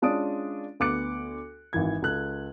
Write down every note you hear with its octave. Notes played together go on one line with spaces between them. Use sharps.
G#3 C#4 D4 F4 D#6 D7
D2 B3 D6 F#6 C#7
G#1 E3 G#6
C#2 A4 F#6